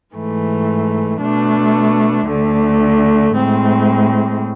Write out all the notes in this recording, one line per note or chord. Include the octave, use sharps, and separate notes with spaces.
G#2 E3 A3
B2 A3 D4
D2 D3 A3
A2 G#3 C4